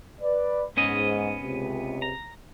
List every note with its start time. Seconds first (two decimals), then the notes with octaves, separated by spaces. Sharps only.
0.22 B4 D5
0.77 G#2 B3 C#4 D#5
1.42 C#2 C3
2.02 A#5